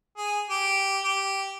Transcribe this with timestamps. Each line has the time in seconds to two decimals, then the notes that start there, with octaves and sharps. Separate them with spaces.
0.17 G#4
0.50 G4
1.04 G4